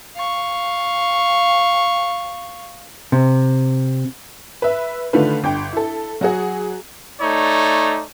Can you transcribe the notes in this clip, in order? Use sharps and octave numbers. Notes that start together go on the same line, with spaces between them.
F5 C#6
C3
B4 E5
D3 D#3 A3 F4 B4
G1 G5
E4 A4
F#3 F#4 G#4
A3 D#4 C#5 D5